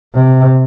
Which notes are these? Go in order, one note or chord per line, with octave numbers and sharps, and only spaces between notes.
C3